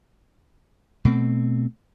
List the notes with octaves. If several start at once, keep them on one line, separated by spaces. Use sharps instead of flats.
B2 A3 C4